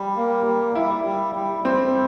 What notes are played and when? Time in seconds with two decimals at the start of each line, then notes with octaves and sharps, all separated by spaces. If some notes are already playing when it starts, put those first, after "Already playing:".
Already playing: G3
0.16 A#3
0.46 G3
0.75 G3 E4
1.05 G3
1.35 G3
1.64 G3 C4